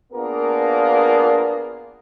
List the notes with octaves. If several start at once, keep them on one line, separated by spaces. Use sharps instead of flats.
A#3 B3 D4 F4 G#4 A#4